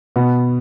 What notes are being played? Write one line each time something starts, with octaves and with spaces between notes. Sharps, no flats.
B2 B3